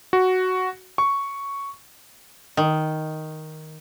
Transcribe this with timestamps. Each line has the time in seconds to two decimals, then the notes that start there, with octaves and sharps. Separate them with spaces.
0.13 F#4
0.98 C#6
2.57 D#3